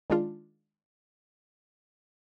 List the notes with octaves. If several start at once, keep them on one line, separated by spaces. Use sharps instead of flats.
D#3 G#3 D4 F4